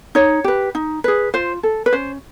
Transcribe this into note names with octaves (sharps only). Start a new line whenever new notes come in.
D#4 C#5
G4 B4
D#4
G#4 B4
F4 C5
A4
B4
C#4 C5